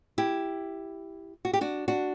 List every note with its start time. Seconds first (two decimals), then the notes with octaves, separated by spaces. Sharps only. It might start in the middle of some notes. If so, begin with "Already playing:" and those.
0.18 E4 G4
1.45 F#4
1.53 G4
1.61 D4 F#4
1.88 D4 F#4